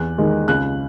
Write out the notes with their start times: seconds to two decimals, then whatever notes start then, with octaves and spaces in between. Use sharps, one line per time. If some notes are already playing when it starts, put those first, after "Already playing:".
Already playing: E2 F#6
0.18 D#3 G#3
0.48 C#2 F#6